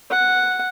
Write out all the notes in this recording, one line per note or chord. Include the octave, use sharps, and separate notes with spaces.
F#5